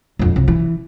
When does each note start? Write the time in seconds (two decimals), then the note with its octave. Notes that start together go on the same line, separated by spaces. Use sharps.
0.19 D1 F2
0.36 C2
0.48 E3